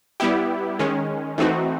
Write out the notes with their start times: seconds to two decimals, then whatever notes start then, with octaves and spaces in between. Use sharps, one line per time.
0.20 G3 B3 E4 G4
0.79 D#3 G#3 C#4
1.38 E3 A3 C4 D#4 F#4